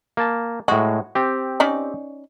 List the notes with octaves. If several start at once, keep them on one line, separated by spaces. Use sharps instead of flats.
A#3 A5
A2 G#3 F#4
C4 G4
C#4 D#4 D5